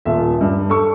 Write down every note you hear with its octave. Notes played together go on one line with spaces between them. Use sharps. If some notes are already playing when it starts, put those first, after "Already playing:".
D#1 F4 E5
G2
A4 C#6